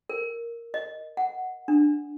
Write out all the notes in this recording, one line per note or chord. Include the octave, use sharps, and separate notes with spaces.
A#4
D#5
F#5
D4